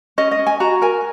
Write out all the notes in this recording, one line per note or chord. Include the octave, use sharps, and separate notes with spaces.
C#4 D#5
D#5
C#4
G#5
F#4 A#5
A#4 G#5